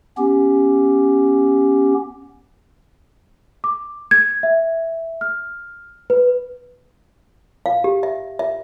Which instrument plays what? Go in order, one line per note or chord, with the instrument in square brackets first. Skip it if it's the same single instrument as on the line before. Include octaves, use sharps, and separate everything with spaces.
[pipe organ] B3 C#4 G4
[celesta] D6
G#6
E5
F6
B4
[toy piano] F5
G4
E5
E5